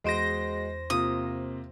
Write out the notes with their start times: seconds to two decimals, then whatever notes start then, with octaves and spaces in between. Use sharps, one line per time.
0.04 E2 G#3 F#4 C5 D#5 A#6 D7
0.90 C3 A#3 F4 D#6